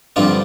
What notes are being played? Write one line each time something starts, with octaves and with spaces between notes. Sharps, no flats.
G2 D3 F3 C4 D4 F4